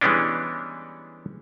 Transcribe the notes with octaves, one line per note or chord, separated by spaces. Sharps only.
E3 G3 G#3 B3 C#4 D4